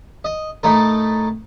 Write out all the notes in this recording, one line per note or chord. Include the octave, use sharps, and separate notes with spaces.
D#5
A2 A3 D#4 A#4